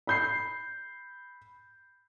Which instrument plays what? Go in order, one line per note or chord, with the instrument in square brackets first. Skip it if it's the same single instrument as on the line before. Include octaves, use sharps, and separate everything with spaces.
[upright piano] B5 G6 C7